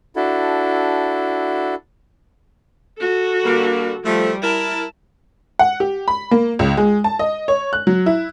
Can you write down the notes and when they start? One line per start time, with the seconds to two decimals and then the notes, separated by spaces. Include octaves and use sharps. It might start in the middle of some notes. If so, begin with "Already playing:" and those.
0.16 D4 E4 F#4 A4
2.98 F#4 A4
3.44 D3 G3 A#3
4.04 F3 G3 A3
4.42 E4 A#4 A5
5.59 F#5
5.80 G4
6.08 B5
6.31 A#3
6.59 C#2
6.77 G#3
7.04 A5
7.19 D#5
7.48 C#5
7.73 F#6
7.87 F#3
8.06 E4